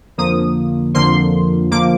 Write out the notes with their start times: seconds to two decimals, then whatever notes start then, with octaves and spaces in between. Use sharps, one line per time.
0.18 F2 D3 F3 A#3 D#6
0.94 F2 D3 F3 A#3 C6
1.71 D3 F3 A#3 D6